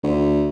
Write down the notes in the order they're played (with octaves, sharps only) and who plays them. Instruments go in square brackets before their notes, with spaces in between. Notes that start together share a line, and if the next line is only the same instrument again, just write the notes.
[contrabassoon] D2